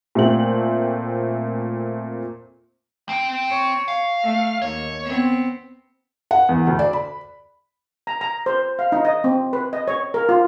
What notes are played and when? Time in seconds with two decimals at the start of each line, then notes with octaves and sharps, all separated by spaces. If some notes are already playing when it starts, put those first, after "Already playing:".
0.15 A#2 A3 C4 F#7
3.09 C4 G5
3.50 C#5
3.88 F5
4.23 A3
4.62 D#2 C#5
5.05 B3 C4
6.31 F#5
6.49 E2
6.67 D2
6.79 D5
6.93 B5
8.07 A#5
8.21 A#5
8.46 C5
8.79 F5
8.92 D#4
9.05 D#5
9.24 C4
9.53 B4
9.73 D#5
9.88 C#5
10.14 A#4
10.29 F4